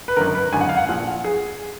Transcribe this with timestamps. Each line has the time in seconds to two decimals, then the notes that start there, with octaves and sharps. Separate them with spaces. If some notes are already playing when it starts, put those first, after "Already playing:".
0.08 B4
0.17 G#1 F#2 D3 A#4
0.35 B4
0.53 G#1 F#2 D3 G#5
0.61 F#5
0.69 F5
0.77 F#5
0.89 A#1 A#2 F3
1.24 G#4